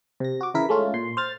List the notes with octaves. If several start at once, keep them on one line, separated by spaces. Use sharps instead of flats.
C3 A#6
F#4 D6
C#3 E3 E4 A#4 B6
G#3 A3 C#4 F4
A#2 C6
C5 F6 A6